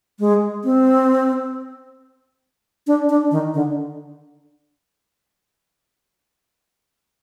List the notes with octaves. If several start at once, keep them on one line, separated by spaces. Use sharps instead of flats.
G#3
C4
D4
D4
D#3
D3